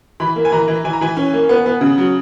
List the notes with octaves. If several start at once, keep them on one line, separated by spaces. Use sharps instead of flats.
E3 B5
A#3
G#5
E3 A#5
E3
E3 G#5
A#5
E3 G#5
C#4
A#3
B3
B3
C#3
F#3